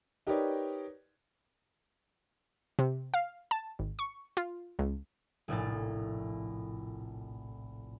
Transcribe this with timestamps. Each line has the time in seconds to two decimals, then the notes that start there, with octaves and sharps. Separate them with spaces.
0.27 D#4 G4 A#4 B4 C#5 D5
2.79 C3
3.14 F5
3.51 A5
3.79 G#1
3.99 C#6
4.37 F4
4.79 C#2
5.48 F1 A#1 A2 A6